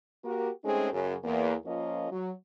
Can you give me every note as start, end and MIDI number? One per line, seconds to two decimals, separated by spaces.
0.25 0.50 58
0.25 0.50 66
0.25 0.50 67
0.25 0.50 70
0.64 0.88 56
0.64 0.88 57
0.64 0.88 60
0.64 0.88 61
0.64 0.88 63
0.64 0.88 68
0.93 1.16 42
0.93 1.16 49
0.93 1.16 68
1.24 1.55 40
1.24 1.55 58
1.66 2.09 53
1.66 2.09 58
1.66 2.09 61
1.66 2.09 65
1.66 2.09 70
1.66 2.09 75
2.12 2.31 54